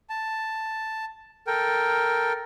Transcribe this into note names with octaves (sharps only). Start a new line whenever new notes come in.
A5
A4 A#4 G5